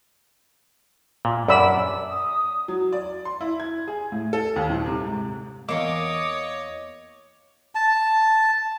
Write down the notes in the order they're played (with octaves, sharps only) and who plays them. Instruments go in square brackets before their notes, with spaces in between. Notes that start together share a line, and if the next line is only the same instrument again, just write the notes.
[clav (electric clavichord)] A#2
[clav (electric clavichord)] F#2 [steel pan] D5 B5 E6
[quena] D#6
[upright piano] F#3
D5
C6
E4
G#6
G#4
A2
A4
D#2
D#1
C3
G#2
[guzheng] E2 A#3 [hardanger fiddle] C#5 [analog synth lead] D#5 [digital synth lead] D6
[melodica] A5